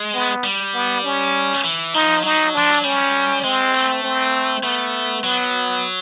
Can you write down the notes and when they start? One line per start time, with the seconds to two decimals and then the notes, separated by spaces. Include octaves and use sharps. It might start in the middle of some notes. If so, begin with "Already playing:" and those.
Already playing: G#3
0.14 B3
0.44 G3
0.74 B3
1.04 C#4
1.64 E3
1.94 F3 D#4
2.23 F#3 D#4
2.54 F3 D4
2.71 F#3
2.84 G3 C#4
3.44 G#3 C4
3.74 A3
4.03 C4
4.63 A3 B3
5.24 F#3 B3